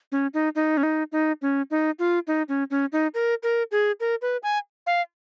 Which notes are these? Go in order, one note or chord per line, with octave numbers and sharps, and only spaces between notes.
C#4
D#4
D#4
C#4
D#4
D#4
C#4
D#4
F4
D#4
C#4
C#4
D#4
A#4
A#4
G#4
A#4
B4
G#5
F5